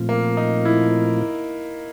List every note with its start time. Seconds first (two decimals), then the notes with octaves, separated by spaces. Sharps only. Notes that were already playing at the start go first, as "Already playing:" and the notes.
Already playing: A#2 F3 A3 C4 F4
0.09 A#3
0.37 D#4
0.65 E4